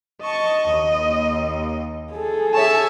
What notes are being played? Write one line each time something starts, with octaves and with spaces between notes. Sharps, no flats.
D#5 A5 C#6
D#2
G#4 A4
C#5 E5 G#5 A5